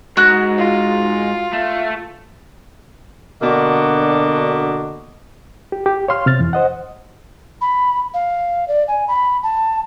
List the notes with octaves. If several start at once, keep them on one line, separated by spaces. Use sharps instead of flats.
G#2 F#4 F#6
F4
A3
B2 D3 A#3 D4 F#4 D#5
G4
G4
C#5 F5 C6 F6
C3 F6 A6
F2 E3
C5 D#5 F#5
B5
F5
D5
G#5
B5
A5